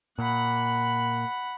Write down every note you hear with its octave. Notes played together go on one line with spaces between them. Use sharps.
A#2 F#5 B5